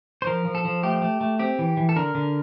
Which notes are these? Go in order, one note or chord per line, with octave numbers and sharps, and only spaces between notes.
C5
F3 A#4
F3
A4
F3
A3 G4
A3
A3
C4 G4
E3
E3
A4
D3 A#4
D3